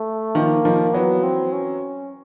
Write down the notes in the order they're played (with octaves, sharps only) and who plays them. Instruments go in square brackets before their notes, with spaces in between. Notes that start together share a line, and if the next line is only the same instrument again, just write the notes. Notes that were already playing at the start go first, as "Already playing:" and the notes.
Already playing: [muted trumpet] A3
[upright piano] D#3 F3 [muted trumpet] A#3
[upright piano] D#3 F3
[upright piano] E3 F#3 [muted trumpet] B3
[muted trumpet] C4
C#4